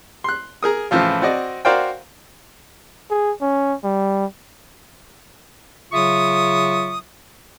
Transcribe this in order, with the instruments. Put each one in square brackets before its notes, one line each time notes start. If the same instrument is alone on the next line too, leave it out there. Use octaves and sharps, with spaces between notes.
[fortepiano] C6 F#6
G#4 A#4 D#6
A2 C#3 E3 F3 F4
C4 F#4 D5 D#5
F#4 A#4 C5 D5 F5 G5
[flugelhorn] G#4
C#4
G3
[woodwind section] C#3 F#3 F4 E5 C#6 D#6